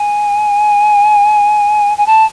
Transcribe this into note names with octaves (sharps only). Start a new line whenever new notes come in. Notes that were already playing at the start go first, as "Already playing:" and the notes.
Already playing: G#5
G#5
A5